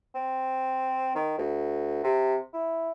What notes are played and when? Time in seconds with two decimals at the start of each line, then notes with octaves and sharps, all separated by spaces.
0.15 C4
1.15 D#3
1.38 D2
2.03 C3
2.53 E4